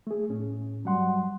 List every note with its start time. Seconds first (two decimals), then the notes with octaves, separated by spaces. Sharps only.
0.07 A3 G#4
0.30 A2 C#4
0.84 G2 F#3 G3 F#5 C6